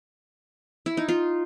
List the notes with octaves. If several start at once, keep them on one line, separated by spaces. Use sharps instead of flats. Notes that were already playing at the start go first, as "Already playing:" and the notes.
E4
D#4
F4